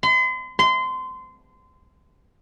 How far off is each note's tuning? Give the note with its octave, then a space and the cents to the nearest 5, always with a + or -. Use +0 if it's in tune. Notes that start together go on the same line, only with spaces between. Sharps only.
C6 -40
C6 -25